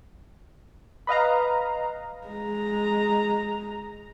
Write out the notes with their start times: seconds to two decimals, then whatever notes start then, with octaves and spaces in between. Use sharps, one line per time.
1.07 B4 D#5 F5 A#5
2.27 G#3 A#5